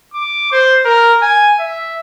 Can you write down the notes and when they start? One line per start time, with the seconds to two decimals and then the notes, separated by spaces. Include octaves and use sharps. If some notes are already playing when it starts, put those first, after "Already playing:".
0.14 D6
0.52 C5
0.85 A#4
1.22 G#5
1.59 E5